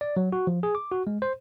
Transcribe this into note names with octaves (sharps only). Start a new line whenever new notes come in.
D5
F#3
F#4
F3
G#4
D6
F#4
G#3
C5